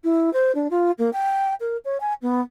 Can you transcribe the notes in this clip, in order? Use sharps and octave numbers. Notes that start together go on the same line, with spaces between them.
E4
C5
D4
F4
A#3
G5
A#4
C#5
G#5
B3